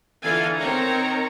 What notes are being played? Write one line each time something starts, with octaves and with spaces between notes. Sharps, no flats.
D3 E3 F4 A4 F5 G#5
D#3 C4 C#5 A#5